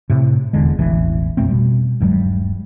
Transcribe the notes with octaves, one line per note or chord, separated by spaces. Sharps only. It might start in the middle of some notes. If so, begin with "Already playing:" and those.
A2 C3
D#1 E2 D3 G#3
E1 A1 E3
F2 A#2 A3 C4
B2 G3
D#1 G2 F#3 G#3